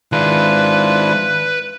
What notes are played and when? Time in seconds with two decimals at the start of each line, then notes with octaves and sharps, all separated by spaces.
0.12 D#3 G#3 D4 E4 F4 B4